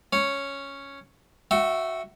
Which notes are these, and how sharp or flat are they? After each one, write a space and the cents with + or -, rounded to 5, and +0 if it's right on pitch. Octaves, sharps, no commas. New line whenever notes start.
C#4 +0 C#5 +0
F#4 -5 E5 +0 G5 -40